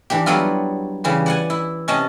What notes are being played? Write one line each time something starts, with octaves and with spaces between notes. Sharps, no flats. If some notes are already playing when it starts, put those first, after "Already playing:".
E3 D4 G4
F#3 G3 B3 E4 F4
C#3 E3 G3
D5 F#5 G#5
E4
C3 C#4 D#5 A5